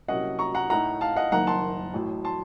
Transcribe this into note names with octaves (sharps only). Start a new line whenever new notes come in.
C2 C3 F#3 A#3 C#4 D#5 F#5
A#5 C#6
F#5 A#5
A2 A3 D#4 F#5 A#5
F5 A5
D#5 F#5
F#1 F#2 D#3 A#3 D#4 F#5 A#5
A5 C6
A1 A2 F#3
A5 C6